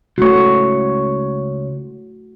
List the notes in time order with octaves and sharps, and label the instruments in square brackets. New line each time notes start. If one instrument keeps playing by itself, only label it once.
[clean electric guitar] C#2 C#5 [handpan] A3 F#4